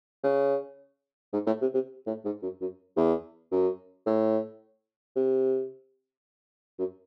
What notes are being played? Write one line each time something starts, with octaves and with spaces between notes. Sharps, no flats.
C#3
G#2
A2
C3
C3
A2
G#2
F#2
F#2
E2
F#2
A2
C3
F#2